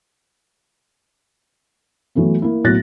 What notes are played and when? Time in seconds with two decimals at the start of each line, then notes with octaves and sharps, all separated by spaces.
2.15 E3 F#3 A3 B3
2.42 A#3 E4
2.64 B1 A2 F#3 F#6 A6 A#6